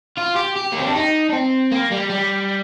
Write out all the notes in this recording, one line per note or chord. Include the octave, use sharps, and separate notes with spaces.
F4
G4
G4
A#3
C4
D4
D#4
D4
C4
A#3
G3
G3